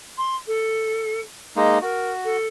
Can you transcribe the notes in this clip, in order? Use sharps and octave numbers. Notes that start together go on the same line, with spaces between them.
C6
A4
G#3 A#3 D#4 D#5
F#4 A#4
A4